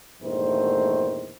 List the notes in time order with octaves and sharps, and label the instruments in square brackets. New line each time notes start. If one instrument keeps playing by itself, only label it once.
[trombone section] E2 G2 A#2 D#3 A3 C5